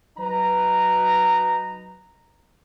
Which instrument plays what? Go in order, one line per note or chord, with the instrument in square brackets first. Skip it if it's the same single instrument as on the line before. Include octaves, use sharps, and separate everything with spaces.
[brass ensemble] F#3 D#4 B4 A#5